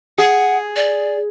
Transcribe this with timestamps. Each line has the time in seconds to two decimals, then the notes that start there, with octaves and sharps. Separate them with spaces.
0.18 G#4 F#5
0.76 D5